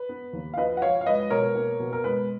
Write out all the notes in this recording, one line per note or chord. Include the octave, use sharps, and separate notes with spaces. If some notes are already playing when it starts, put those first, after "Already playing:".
Already playing: B4
B3
D#2
F5
F3 B4 D#5
F#5
F3 C#5 F5
F5
G#3 B4 D#5
B2 A#4 C#5
A#3
B2
A#4
G#3 B4